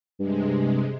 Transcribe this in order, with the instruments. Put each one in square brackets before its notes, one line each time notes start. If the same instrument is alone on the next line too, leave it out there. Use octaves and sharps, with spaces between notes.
[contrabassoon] G2 [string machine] C3 G#3